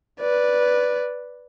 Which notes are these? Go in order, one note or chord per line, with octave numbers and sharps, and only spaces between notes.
B4 D5